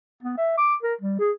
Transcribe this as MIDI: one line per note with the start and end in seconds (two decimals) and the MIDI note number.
0.23 0.37 59
0.37 0.54 76
0.57 0.75 86
0.83 0.94 70
1.01 1.16 55
1.19 1.31 68